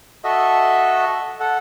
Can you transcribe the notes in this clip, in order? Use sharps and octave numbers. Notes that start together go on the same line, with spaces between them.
F#4 A4 D#5 E5
A4 F#5